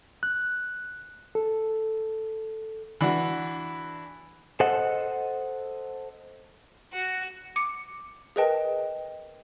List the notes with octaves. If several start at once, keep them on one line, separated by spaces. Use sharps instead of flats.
F#6
A4
E3 D4 F#4
A4 C5 D#5 F#5
F#4
D6 C#7
G#4 A#4 B4 D#5 G5 A5